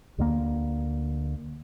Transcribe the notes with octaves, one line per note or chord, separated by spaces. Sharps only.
D2 D3 E3 A#3